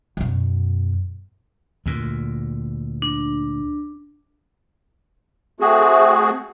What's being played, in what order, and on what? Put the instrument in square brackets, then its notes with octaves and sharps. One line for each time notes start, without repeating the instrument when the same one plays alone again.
[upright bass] F#2 B2
[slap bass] D2 A#2
[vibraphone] D4
[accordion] A3 C4 F#4 G#4